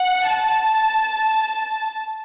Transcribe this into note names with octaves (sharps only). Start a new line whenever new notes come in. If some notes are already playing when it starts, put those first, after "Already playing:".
Already playing: F#5
A5